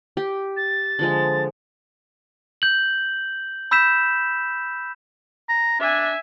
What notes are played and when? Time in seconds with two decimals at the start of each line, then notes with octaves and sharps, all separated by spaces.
0.17 G4
0.57 A6
0.99 D3 F3 G#3
2.62 G6 F#7
3.71 B5 E6 G6 B6 E7
5.49 A#5
5.80 D4 E5 G#5